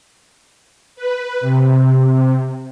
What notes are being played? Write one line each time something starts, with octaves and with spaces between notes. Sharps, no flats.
B4
C3